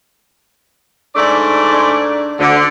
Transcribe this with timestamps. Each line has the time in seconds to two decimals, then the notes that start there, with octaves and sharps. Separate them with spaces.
1.15 G#2 A3 D4 D5
1.73 D4
2.39 D2 D3